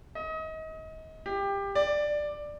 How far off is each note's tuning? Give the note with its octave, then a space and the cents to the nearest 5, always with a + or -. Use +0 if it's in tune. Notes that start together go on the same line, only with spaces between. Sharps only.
D#5 +30
G4 +20
D5 +10